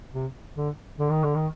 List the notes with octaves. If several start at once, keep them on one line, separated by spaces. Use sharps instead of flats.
C3
D3
D3
D#3
D3
D#3